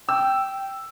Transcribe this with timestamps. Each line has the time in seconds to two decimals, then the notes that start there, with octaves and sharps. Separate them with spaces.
0.09 G5 E6